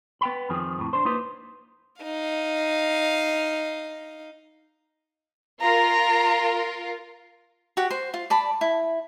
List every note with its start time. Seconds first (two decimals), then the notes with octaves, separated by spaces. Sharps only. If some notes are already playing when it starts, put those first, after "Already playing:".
0.21 B3 G5 B5
0.50 F2 D#3 F3 G#4
0.79 F2 A2
0.93 D4 C5
1.05 A#3 D#4 F4 B4 C5
2.02 D#4 F5
5.61 F4 A#4 A#5
7.77 F#4 G4 F#5
7.91 C5
8.14 F4
8.30 D5 A5 B5
8.61 E4